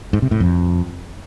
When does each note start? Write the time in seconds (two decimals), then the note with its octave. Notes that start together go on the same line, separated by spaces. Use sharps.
0.13 G#2
0.22 C3
0.31 A2
0.40 F2